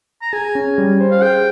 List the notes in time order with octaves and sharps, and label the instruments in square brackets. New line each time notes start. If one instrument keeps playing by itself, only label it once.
[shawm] A#5
[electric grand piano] G#4 [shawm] G#5
[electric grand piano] C#4
G3
C5
[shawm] F5
[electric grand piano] G#4 [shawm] G5